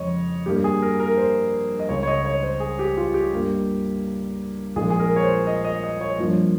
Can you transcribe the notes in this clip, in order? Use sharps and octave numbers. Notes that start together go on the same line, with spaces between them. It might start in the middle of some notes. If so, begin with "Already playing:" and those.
Already playing: F2 C#3 G#3 C#5 D#5
G2 G3 A#3 G4
G#4
A#4
A#4
C5
D#5
C#2 C#3 G#3 C#5
C#5
D#5
C#5
C5
G#4
G4
F4
G4
G2 G3 A#3
A#1 A#2 G#3 G#4
G#4
A#4
C#5
C5
D#5
D#5
D#5
C#5
G2 F3 A#3